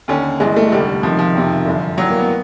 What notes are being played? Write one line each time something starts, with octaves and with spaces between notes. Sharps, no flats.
D#2 D3 C#4
G1 G2 E3 G#3
A3
F1 D#2 D3 G3
C#2 C3 D#3 F3
F3
F#1 F2 C3 D#3
G1 F#2 D3
A1 G2 E3 F#3
A#3
B3